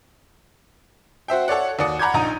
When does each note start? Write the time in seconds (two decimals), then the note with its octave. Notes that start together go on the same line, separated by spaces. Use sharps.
1.28 F#4 C5 E5 G5
1.48 A4 C#5 D5 F#5
1.79 D#2 F#4 D5 D#6 C#7
1.99 F#5 A#5 B5 D6 G6 G#6
2.14 A#1 D#4 A#5 D#6 D#7